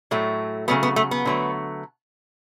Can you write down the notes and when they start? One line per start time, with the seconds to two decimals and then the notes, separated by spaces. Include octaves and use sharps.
0.11 A2 F#3 A3
0.68 C#3 F#3 A3 B3
0.83 B3
0.96 A3
1.11 B3
1.25 D3 F#3 A3